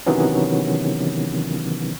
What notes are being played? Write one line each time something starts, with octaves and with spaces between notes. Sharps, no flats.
C3 D#3 E3 F#3 B3 C#4